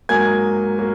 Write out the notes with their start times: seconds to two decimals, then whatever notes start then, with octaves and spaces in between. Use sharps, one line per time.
0.09 G#2 F#3 A#3 G#5 G#6
0.79 F#3 A#3